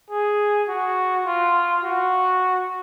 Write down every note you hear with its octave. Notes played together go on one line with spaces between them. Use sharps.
G#4
F#4
F4
F#4